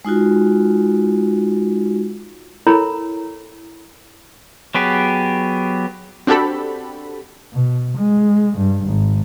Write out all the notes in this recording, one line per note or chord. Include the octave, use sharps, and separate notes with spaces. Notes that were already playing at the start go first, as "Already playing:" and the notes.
G#3 D#4 F4 F#4
E4 A4 A#4 C#5 A#5 B5
F#3 B3 G4 G#4
C4 D4 F#4 G4 A4 B5
B2
G#3
G2
G#1